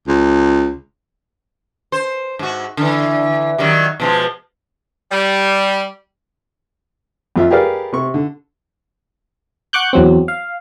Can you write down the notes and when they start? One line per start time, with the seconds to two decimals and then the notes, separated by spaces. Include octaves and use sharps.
0.08 C#2
1.92 C5
2.39 G#2 F#4
2.77 D3 E3
3.58 D#3 F#3 G3
4.00 B2 F3 G#3
5.11 G3
7.36 F2 F4 E5
7.51 G4 G#4 A#4 B4 D5 F5
7.93 C3 C#6
8.14 D3
9.73 F#5 C#6 D6 F#6 G6
9.93 E2 F#3 C4
10.28 F5